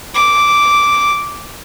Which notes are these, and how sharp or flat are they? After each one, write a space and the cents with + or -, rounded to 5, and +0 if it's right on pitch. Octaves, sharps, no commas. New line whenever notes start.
D6 -5